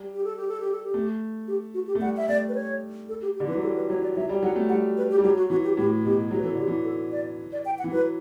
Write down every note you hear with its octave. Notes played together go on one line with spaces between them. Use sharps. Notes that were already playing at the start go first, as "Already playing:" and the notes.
Already playing: G3
G4
A4
G4
A4
G4
A4
G4
A3
G4
F#4
G4
A3
G3 F#5
E5
A3 D5
B4
C#5
A4
G4
G4
D3
E3 B4
F#3
G3 A4
B4
F#3 C#5
D5
F#3 E5
G3
F#3 F#5
A3
G3 F#5
B4
G4
G3
F#3 G4
F#4
E3 F#4
G4
A2 G4
B2 G4
F#3 G4
B4
E3 A4
D3 G4
E3
A4
D5
D5
G5
F#5
E3
F#3 B4